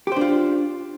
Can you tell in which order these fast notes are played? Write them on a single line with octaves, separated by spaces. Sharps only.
G4 C5 D4 F4